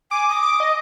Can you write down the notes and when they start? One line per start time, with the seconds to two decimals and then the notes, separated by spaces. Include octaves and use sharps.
0.11 G#5 D6
0.29 D#6
0.42 D6
0.60 D#5